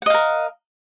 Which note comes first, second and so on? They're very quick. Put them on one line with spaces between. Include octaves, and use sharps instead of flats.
F#5 D#5 F5 A#4